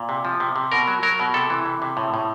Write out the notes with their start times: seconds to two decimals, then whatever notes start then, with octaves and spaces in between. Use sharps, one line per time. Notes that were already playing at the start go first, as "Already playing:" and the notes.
Already playing: A#2
0.09 C3
0.25 F3
0.40 C3
0.56 C3
0.72 B2 A#4
0.88 F#3
1.03 F#3 A#4
1.20 B2
1.34 C3 A4
1.50 E3
1.65 C3
1.82 C3
1.97 A2
2.14 A2